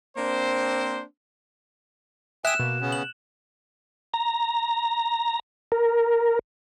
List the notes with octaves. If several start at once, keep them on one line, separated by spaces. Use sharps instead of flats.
A#3 C4 D4 C5
E5 G5 G#5 D#6 F#6 E7
B2 A#3
C#3 B3 C#4
F#7
A#5
A#4